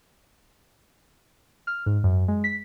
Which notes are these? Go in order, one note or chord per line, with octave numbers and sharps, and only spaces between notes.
F6
G#2
F#2
G#3
B6